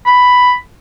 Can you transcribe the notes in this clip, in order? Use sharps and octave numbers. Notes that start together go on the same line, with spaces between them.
B5